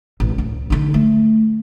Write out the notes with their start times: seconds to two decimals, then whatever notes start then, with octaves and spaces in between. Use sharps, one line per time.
0.20 A1
0.38 C#2
0.70 D3 D#4
0.94 A3